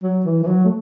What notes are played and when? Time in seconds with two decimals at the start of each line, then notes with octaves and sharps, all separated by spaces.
0.03 F#3
0.25 E3
0.43 E3
0.47 F#3
0.65 A3